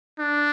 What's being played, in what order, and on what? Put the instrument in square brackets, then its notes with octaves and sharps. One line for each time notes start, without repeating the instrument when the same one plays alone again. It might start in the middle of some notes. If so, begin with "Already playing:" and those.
[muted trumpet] D4